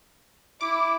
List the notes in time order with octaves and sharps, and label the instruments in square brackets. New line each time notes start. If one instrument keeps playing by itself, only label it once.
[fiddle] E4 [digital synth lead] D6